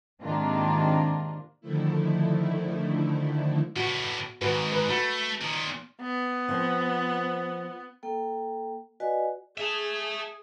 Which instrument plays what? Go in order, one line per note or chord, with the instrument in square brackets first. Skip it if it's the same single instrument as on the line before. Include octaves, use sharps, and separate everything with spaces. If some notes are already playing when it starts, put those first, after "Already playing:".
[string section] G#2 C3 D#3 A#3 D4 F4
[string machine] D3 D#3 F3 A3 E4
[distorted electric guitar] A2 B3 [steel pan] F#4
[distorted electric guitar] G#2 D#3 [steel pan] F#4 B4
[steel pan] B4
[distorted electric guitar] A3 [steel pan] F#4 B5
[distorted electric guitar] A#2 D#3
[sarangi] B3
[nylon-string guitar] F3 C4
[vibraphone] A#3 A4 G5
F#4 B4 D5 D#5 F#5 G#5
[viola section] G#4 [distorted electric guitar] E5 A5